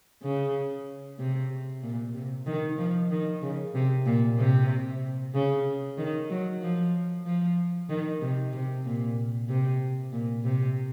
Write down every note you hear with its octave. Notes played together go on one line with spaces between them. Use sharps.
C#3
C3
A#2
C3
D#3
F3
D#3
C#3
C3
A#2
C3
C#3
D#3
F#3
F3
F3
D#3
C3
C3
A#2
C3
A#2
C3